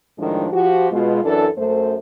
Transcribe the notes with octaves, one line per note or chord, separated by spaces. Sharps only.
A2 D#3 F3 G#3 D4
F3 F#4 G4
B2 G#3 F4
F#2 E3 D4 A4
F#2 A3 C5